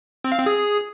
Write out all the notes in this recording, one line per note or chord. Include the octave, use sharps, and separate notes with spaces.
C4
F5
C4
G#4